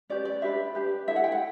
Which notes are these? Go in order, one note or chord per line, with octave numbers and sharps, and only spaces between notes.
C#4 G4 B4 D5
D5
D4 G4 B4 E5
D4 G4 B4
E4 A4 E5
F#5
G5
F#5